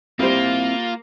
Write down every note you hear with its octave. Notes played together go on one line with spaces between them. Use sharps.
G3 A#3 C4 E4 F4 C5 E5